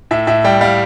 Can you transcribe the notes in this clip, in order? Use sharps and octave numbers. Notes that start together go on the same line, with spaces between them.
A2 E5
A2 E5
G3 G5
G3 F5